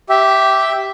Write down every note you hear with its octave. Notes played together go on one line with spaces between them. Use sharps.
G4 E5